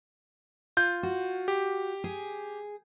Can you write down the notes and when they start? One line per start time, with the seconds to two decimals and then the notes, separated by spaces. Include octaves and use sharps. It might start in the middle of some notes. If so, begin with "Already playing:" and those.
0.77 F4 G6
1.03 F#4
1.48 G4
2.04 G#4